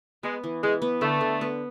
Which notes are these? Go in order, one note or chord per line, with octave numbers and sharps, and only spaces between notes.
G#3 B3
E3
E3 G#3
B3
D3 A3
D3
B3